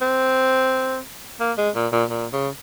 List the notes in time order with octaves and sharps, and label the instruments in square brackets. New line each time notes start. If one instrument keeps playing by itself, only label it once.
[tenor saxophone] C4
A#3
G#3
A#2
A#2
A#2
C#3